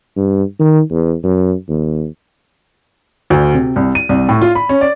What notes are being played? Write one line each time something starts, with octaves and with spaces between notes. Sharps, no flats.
G2
D#3
E2
F#2
D#2
D2
C3
C2
D#7
C2
A2
F4
B5
C#4
D5